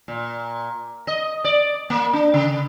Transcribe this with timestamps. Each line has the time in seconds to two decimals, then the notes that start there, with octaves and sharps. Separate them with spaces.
0.08 A#2
1.07 D#5
1.44 D5
1.90 A#3
2.13 D4
2.34 C#3